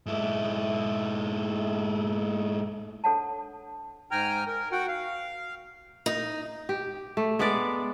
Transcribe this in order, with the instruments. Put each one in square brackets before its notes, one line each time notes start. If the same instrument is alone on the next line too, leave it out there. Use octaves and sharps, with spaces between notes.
[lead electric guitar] G#2 E4
[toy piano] D4 A4 C#5 F#5 A5
[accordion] G#2 G5 G#5 A#5 F6
A#4
F#4 F#5 G5
F5
[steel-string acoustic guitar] D#4
[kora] G4
A3
G#3 B3 B4 D5